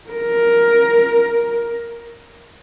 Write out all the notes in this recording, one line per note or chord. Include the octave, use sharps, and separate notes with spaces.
A#4